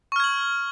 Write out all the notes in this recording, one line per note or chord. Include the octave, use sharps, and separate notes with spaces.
C#6 F6 G#6 F#7